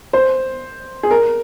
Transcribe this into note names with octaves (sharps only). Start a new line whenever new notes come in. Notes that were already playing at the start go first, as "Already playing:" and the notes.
C5
G#4
A#4